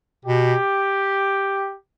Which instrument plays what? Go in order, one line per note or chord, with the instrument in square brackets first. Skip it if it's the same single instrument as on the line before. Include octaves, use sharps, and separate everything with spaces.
[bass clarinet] B2 [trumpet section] G4